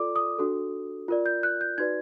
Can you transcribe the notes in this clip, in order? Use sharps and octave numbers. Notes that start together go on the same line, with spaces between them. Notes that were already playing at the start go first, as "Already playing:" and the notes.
Already playing: F4 A4 D5 D6
D#6
D4 F#4 A4
F4 A#4 D5
G6
F#6
G6
D#4 F#4 B4 D5 G#6